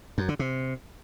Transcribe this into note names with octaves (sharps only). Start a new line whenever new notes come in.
F#2
D3
C3